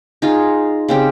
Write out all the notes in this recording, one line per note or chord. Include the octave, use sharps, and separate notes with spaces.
D#4 F4 G#4
C#3 C4 G4